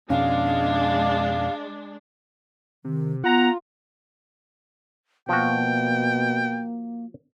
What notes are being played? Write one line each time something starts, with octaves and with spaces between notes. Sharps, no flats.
F2 B2 G#3 C#4 D4 F5
C3 D#3
B3 F4 F#5 A#5
B2 F3 A#3 F#4 G5